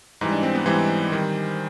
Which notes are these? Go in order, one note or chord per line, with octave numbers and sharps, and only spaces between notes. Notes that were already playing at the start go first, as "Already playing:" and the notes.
G#2 E3 G3 D#4
D4
C4
B3
G#2 E3 G3 C4
D#3 G3